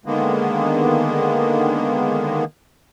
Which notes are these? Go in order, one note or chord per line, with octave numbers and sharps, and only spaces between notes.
D3 D#3 G#3 A#3 B3